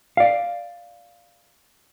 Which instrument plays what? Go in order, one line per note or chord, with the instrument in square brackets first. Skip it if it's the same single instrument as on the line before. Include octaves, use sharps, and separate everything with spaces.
[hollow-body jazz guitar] D5 F5